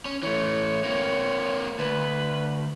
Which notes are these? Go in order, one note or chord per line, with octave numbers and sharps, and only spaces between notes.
C#4
E3 A3 C#5
A#3 C4
D2 B4